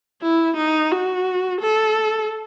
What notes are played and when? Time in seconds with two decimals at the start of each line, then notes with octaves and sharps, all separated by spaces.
0.22 E4
0.57 D#4
0.92 F#4
1.61 A4